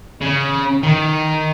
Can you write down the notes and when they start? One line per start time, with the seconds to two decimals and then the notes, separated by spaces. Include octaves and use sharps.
0.21 C#3
0.83 D#3